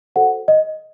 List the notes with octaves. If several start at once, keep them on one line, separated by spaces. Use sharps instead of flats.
F#4 A4 C5 F#5
D#5